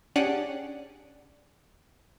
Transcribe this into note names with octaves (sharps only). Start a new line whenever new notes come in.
C#4 D4 G4 G#4 D5 F#5